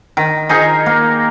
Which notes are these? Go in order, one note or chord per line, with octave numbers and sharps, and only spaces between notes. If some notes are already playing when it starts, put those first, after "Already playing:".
D#3
D#4 G#4 A#4
A#3